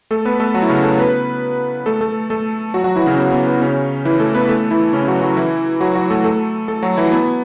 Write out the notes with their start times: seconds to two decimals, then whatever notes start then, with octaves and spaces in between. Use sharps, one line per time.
0.11 A3 A4
0.25 B3 B4
0.40 A3 A4
0.54 F#3 F#4
0.62 E4
0.69 C#3 C#4
0.84 A3 A4
0.98 B3 B4
1.86 A3 A4
2.01 A3 A4
2.30 A3 A4
2.74 F#3 F#4
2.84 F#3 F#4
2.96 E3 E4
3.07 C#3 C#4
3.18 B3
3.32 B3
3.47 B3
3.61 C#3 C#4
4.05 E3 E4
4.20 A3 A4
4.35 B3 B4
4.49 A3 A4
4.71 E3 E4
4.93 C#3 C#4
5.07 F#3 F#4
5.22 F#3 F#4
5.37 E3 E4
5.81 F#3 F#4
5.95 F#3 F#4
6.10 A3 A4
6.24 A3 A4
6.68 A3 A4
6.83 F#3 F#4
6.97 E3 E4
7.12 B3